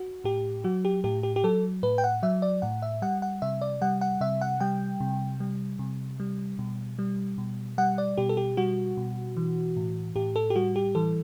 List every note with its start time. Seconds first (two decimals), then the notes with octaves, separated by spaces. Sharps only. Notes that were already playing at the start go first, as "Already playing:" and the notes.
Already playing: F#4
0.24 A2 G4
0.64 F#3 F#4
0.85 G4
1.04 A2 G4
1.23 G4
1.36 G4
1.44 F#3 A4
1.83 A2 B4
1.98 G5
2.04 F#5
2.23 F#3 E5
2.42 D5
2.62 A2 F#5
2.82 E5
3.02 G3 F#5
3.22 F#5
3.42 C3 E5
3.61 D5
3.81 G3 F#5
4.01 F#5
4.21 C3 E5
4.41 F#5
4.60 G3 G5
5.00 C3
5.40 G3
5.79 C3
6.20 G3
6.59 B2
6.99 G3
7.38 B2
7.78 G3 F#5
7.98 D5
8.17 B2 G4
8.29 A4
8.37 G4
8.57 G3 F#4
8.97 B2
9.37 E3
9.76 A2
10.16 A2 G4
10.36 A4
10.50 G4
10.56 G3 F#4
10.76 G4
10.95 E3 A4